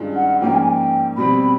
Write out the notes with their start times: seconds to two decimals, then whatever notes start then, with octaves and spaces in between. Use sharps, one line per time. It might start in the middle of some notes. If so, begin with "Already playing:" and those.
Already playing: G2 D#3 G#3 C#4 F4
0.16 F#5
0.41 G#2 F3 A#3 C#4 G5
0.54 G#5
0.67 G5
1.17 B2 G3 C4 B5